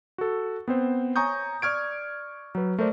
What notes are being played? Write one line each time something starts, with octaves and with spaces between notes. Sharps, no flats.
F#4 A4
B3 C4 C5
C#5 G#5 A#5 C#6 D#6 G6
D5 C#6 F6 G#6 D7
F#3 B4
A3 A#4 C5 D5